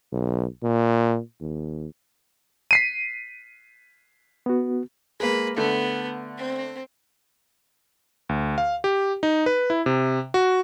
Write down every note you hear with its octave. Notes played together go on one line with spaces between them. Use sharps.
B1
A#2
D#2
B6 C7 D#7
B3 F#4
G#3 A#3 B4
D3 A3 B3
C4
D2
F5
G4
D#4
B4
E4
C3
F#4